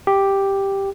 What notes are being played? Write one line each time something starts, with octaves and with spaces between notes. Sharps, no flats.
G4